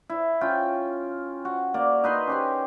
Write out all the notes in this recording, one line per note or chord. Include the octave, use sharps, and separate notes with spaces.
E4
C#4 F4 G5
F#4
A#3 D5
D#4 B4 C6
C#4 G4 C6